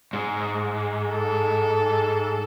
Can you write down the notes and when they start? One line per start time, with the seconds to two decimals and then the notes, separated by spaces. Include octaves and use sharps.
0.13 G#2
1.09 A4